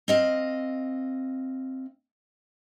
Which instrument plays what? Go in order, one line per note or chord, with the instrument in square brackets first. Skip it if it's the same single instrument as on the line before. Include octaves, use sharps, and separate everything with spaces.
[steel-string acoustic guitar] C4 D#5 F5